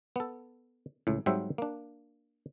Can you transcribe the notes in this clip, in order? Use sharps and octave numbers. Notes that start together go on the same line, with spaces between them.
B3 A4
C#2 A2
G#2 F#3 G3 C4 C5 E5
A#3 D4